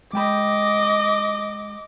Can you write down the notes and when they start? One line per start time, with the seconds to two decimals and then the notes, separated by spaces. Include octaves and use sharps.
0.13 G#3 D#5 G5 B5 D6